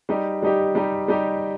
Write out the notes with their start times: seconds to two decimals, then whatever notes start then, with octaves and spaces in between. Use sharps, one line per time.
0.09 G3 D#4 G4
0.42 G3 D#4 G4
0.75 G3 D#4 G4
1.08 G3 D#4 G4